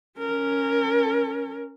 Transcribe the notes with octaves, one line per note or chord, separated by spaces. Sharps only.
C#4 A#4